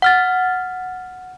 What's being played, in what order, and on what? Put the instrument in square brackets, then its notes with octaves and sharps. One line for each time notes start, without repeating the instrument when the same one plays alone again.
[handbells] F#5 F6 A6